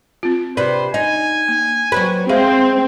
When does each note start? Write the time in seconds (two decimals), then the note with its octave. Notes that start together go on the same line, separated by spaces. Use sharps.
0.23 C4 F4
0.57 C3 B4 C5 D5
0.94 D#4 G#5
1.48 A#3
1.92 F#3 C4 B4
2.29 G#3 C4 G#4 E5 F5